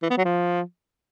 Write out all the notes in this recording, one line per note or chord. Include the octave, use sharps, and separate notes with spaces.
E3
B3
F#3
F3